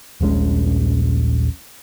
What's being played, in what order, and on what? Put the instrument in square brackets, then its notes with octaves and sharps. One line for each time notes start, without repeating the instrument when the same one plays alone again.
[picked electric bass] D#1 A#1 G#3 C#4